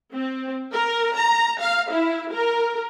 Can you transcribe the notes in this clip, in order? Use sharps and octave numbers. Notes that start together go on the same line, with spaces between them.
C4
A#4
A#5
F5
E4
A#4